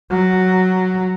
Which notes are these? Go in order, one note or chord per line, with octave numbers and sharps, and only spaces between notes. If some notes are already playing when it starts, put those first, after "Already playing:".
F#3